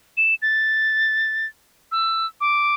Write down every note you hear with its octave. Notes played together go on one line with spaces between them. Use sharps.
E7
A6
E6
D6